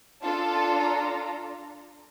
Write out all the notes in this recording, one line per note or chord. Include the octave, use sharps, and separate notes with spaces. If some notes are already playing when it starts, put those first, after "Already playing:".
D4 F4 A4 A5
A#5